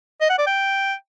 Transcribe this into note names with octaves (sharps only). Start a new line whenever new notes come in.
D#5
F#5
D5
G5